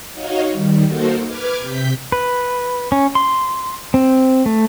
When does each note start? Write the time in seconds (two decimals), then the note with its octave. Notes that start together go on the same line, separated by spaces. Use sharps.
0.12 D#4 F#4 C#5 D#5 F5
0.52 D#3 G3
0.87 A#3 D#4 F#4 A4 A#4 C5
1.25 B4 D6 F6 G#6
1.60 C3 G6 B6
2.12 B4
2.92 C#4
3.15 C6
3.94 C4
4.46 A3